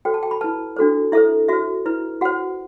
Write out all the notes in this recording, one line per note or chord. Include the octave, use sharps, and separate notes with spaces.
F#4 A4 C5 G5
A5
G5
B5
E4 B4 A5
D4 F#4 A4 C5
E4 A4 C5 E5
F#4 C5 E5
E4 B4
F#4 C5 F#5